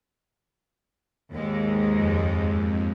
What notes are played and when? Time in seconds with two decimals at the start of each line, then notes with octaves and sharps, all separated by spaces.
1.31 D#2 G#2 G#3
1.94 F2